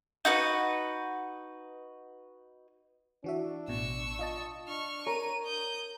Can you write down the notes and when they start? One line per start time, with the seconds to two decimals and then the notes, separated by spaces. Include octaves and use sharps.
0.25 D#4 F#4 B4
3.24 E3 D4 F#4 E5
3.68 A1 B2 C#6 E6
4.19 F4 D#5 A5
4.68 D4 C#6 F6
5.06 A#4 C#5 D#7
5.45 D#6 G6